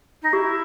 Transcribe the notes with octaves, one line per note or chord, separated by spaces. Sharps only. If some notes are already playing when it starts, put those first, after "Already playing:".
D#4
E4 G4